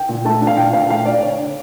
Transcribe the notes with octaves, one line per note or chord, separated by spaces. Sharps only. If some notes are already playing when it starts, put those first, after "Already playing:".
Already playing: G5
A#2
A3 A5
D4
F5
A#2 G5
A#2 F5
A3 F5
D4 D5
D3 C#5
D3